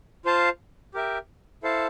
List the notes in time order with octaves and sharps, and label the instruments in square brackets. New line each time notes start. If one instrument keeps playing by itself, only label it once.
[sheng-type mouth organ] F4 C5 F5 A5
G4 A#4 E5 G5
E4 A4 C5 F5 A5